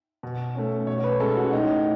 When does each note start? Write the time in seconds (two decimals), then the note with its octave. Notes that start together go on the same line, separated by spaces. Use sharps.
0.23 B2
0.55 A3 C#4
0.87 B2 C#5
0.98 C#5
1.04 B4
1.20 G#3 C#4 A4
1.37 F#4
1.53 A2 D#4